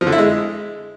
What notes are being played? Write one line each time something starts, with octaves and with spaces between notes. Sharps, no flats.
F3
D3
E4
G#3